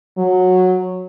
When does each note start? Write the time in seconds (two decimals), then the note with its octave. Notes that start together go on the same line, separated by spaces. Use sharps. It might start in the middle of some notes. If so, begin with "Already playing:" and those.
0.18 F#3